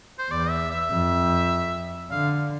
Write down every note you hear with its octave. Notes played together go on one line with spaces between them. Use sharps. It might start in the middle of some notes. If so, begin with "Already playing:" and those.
C5
E2 D5
E5
E5
F2
D3 F5